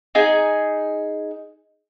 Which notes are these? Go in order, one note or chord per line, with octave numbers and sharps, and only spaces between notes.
D#4 G#4 G#5